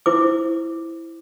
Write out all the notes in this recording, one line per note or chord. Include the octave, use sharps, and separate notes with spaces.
E4 C5 D6